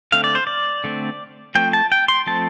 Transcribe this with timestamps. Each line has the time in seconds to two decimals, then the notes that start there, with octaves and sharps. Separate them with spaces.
0.12 D3 A3 C4 F5
0.24 D5
0.35 C5
0.47 D5
0.84 D3 A3 C4
1.55 F3 A3 C4 G5
1.73 A5
1.92 G5
2.08 C6
2.27 F3 A3 C4 A5